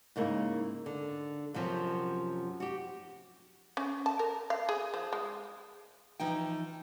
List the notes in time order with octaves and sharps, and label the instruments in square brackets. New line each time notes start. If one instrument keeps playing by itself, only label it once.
[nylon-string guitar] G#2 C#3 A#3 E4
D3
F#2 C3 F3 F#3
F#4 G4
[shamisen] C#4
A5
A#4
F5
G#4
F3
G#3
[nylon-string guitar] E3 F3 D#4 G5